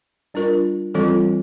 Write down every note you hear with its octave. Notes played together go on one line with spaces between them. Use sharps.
G3 D4 F4 A#4
E3 G3 C4 F4 A4